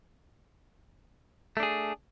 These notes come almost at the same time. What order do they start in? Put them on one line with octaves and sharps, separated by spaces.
A3 D4 G#4